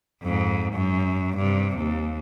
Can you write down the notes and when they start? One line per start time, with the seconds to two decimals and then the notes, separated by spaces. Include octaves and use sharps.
0.23 F2 G#2
0.74 F#2
1.37 G2 C3
1.78 D#2